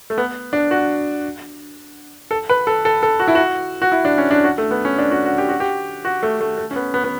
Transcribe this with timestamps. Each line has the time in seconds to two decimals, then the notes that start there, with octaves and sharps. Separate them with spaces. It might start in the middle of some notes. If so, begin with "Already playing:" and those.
0.10 A3
0.18 B3
0.53 D4
0.71 F#4
2.31 A4
2.49 B4
2.67 A4
2.85 A4
3.03 A4
3.20 F#4
3.28 E4
3.35 F#4
3.82 F#4
3.92 E4
4.05 D4
4.18 C#4
4.31 D4
4.44 F#4
4.58 A3
4.71 B3
4.85 C#4
4.98 D4
5.11 F#4
5.25 F#4
5.38 G4
5.49 F#4
5.60 G4
6.05 F#4
6.23 A3
6.41 A3
6.58 A3
6.71 C#4
6.76 B3
6.94 B3
7.04 B3